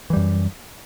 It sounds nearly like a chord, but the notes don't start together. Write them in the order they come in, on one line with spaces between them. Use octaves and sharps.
E3 G3 F#2